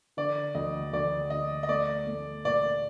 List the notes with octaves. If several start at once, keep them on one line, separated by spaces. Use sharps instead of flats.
D3 D5
D2 D#5
D2 D5
D2 D#5
D#5
A3 D5
A3
A#2 D5